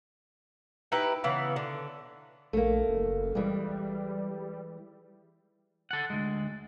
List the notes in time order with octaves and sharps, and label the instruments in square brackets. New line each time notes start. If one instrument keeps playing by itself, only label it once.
[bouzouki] D#4 E4 G4 B4
C#3 E3 B3
D3
[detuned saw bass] A#1 [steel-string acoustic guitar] A3 A#3
[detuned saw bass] F#1
[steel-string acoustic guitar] E3 G#3 [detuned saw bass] G3
[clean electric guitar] A4 F#5
D2 G#3